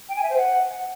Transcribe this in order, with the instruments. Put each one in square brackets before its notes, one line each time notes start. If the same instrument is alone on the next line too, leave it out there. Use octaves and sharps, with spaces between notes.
[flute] G5
G#5
E5
C5
F#5